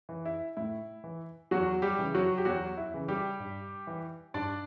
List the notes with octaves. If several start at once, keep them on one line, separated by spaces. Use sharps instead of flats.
E3
E4
A2 E4
E3
E2 F#3 F#4
G3 G4
C#3 E3
F#3 F#4
G4
E2 F#3 F#4
E4
C#3 E3
G3 G4
G2
E3
G2 D4 D5